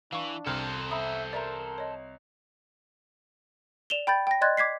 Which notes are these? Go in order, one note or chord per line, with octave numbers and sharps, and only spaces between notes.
E3 D4 F5 C#6
C2 A4 C5 F6
E5 A#5 B5 D#6
A#4 D5 E5 A#5
C#5 D#5
D5 E7 F7 G7
G5 B5 G6 A6
G5 A#6
D5 D#5 C6 F#6 G#6 A6
D6 G#6 B6 C7